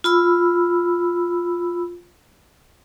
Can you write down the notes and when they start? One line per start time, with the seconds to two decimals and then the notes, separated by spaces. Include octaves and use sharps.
0.04 F4 B5 E6